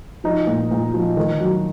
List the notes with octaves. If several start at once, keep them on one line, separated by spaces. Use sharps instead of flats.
F3 D#4
A#2
A#2
F3
D#3
F#3